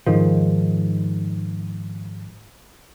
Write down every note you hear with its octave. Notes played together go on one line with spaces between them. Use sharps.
G#2 D#3 F3